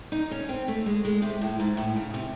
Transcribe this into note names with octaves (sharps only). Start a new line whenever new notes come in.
D#4
C#4
C4
A3
G#3
G#3
C3
A2
G#2
A2
C#3
C3